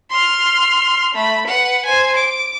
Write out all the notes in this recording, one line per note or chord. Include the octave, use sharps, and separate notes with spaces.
C6 F6
A3 B5
B4 F#5
C5 G#5
D6